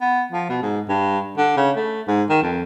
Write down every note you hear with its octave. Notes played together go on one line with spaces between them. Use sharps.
B3
F3
B2
G#2
G2
D3
C#3
A3
G#2
D#3
F2